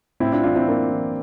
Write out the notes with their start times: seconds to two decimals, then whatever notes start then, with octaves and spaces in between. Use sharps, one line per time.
0.20 A2 C4 E4
0.32 D4 F4
0.44 E3 D4 F4
0.56 C4 E4
0.68 A2 A#3 D4
0.92 E3